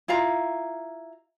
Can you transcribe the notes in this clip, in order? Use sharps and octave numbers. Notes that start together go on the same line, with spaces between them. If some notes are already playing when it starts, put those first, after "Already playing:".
E4 F4 F5 A#5